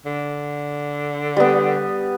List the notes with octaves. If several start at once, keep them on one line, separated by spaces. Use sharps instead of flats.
D3
G3 B3